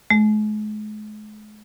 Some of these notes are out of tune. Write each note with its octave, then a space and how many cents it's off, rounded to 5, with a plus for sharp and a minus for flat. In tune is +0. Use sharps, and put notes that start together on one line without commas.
G#3 +40